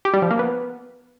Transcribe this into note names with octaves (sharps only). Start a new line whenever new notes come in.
G4
G3
F3
A#3
B3